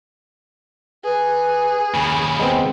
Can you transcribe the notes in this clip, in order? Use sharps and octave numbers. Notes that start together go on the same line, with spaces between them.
G#4 B4
D#2 C#3 B5
G#3 B3 C4